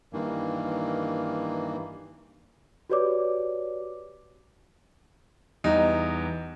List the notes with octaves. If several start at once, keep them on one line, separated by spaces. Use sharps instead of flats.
G2 D#3 E3 A#3
F#4 G4 B4 C#5 D5 D6
E2 G3 D#4